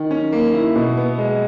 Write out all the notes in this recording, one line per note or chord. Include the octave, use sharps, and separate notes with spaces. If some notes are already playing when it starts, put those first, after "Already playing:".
Already playing: D#3
C#4
A#3
E4
B2
B3
G#3